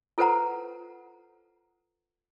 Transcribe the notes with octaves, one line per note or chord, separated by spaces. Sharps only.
F4 A4 B4 C5 F#5 A#5